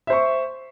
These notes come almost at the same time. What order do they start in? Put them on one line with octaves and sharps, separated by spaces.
E5 C5 C#6